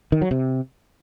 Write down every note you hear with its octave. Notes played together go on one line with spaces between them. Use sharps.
D#3
F#3
C3